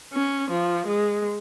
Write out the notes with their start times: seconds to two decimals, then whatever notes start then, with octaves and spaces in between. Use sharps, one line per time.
0.13 C#4
0.51 F3
0.87 G#3